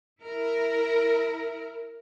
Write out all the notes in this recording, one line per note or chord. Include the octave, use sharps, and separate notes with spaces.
E4 A#4